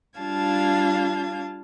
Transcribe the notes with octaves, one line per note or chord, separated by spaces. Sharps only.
G3 D4 F4 F5 A5 G#6